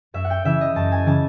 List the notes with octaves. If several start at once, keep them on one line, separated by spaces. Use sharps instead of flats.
F#2 E5
F#5
G5
C#3 E3 E5
D#5
F#2 A5
G#5
C#3 E3 A5